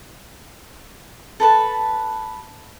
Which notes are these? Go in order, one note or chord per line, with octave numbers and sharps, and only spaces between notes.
A4 B4 A5